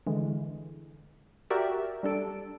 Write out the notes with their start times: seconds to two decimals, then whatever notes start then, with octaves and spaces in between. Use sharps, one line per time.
0.07 D3 E3 G#3
1.50 F#4 G4 A#4 D5 E5
2.03 G3 D4 A4 D7